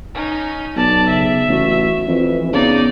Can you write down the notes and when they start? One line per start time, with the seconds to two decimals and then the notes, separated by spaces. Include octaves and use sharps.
0.15 C#4 D#4
0.76 B1 D5 A5
1.08 C#3 E5
1.49 A1 F#4
2.08 F2 E3
2.53 C#3 B3 D#4 D5